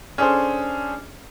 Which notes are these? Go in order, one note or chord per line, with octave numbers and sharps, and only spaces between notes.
C#4 D4 G#4 A4 C5